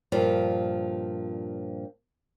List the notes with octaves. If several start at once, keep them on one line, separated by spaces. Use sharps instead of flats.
G2 A#2 F3